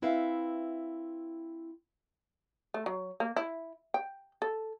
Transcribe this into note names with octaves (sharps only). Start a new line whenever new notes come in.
C4 E4 B4 E5 F5
A3
F#3
A#3
E4
G5
A4